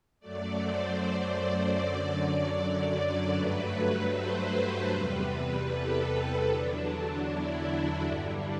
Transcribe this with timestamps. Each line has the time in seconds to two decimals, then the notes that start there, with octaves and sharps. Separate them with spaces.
0.20 F#2 F#3 A3 D5
0.59 C5
1.37 D5
1.76 F#2 D3 F#3 D5
2.16 D5
2.95 D5
3.34 G2 F#3 A3 B4
4.12 C5
4.90 E2 C3 G3 B4
5.69 A4
6.47 E2 D3 F#3 D4
7.26 E4
8.04 G2 D3 G3